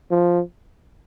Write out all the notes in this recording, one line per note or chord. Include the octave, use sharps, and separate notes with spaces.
F3